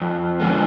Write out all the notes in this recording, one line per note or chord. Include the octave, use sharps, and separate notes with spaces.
F2
D3 F3 G#3 B3